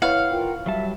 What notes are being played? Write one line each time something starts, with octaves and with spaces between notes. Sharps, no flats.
E4 B4 C#5 F5 F#5
F4 A#4 G5
F#3 G3 E5 A5